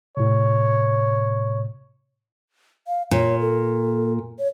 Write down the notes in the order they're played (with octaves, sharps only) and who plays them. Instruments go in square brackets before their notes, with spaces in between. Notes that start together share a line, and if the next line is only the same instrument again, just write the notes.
[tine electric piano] A2 C3 [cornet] C#5
[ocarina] F5
[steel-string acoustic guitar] A#2 [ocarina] C#5
[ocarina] A4
C#5